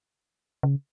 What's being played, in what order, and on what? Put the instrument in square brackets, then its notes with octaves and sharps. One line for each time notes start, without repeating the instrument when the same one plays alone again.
[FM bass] C#3